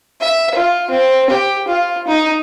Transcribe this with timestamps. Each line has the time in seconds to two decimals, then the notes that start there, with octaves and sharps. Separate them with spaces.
0.21 E5
0.55 F4
0.90 C4
1.30 G4
1.68 F4
2.08 D#4